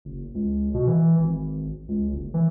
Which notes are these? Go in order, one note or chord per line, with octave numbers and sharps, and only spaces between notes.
F#1
C#2
B2
E3
G#1
C#2
F#1
E3